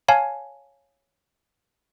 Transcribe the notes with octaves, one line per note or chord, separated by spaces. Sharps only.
C#5 F5 G#5 A5